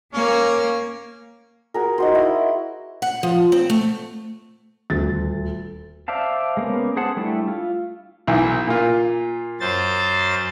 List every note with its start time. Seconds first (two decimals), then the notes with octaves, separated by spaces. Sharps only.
0.14 A#3 C#4
1.74 F#4 G#4 A#4
1.98 D#4 F#4 C5
2.15 E4
3.02 F#5
3.23 F3
3.52 C4
3.70 A3
4.90 D#1 D2 A6
6.08 C5 D5 E5 F5 A5
6.57 G#3 A#3 B3 C#4
6.97 G#4 C5 F#5 A5
7.17 G3 A3 D4 E4 A4
7.48 F4
8.27 B1 E3
8.67 A#2 F4
9.60 F#2 C5 A6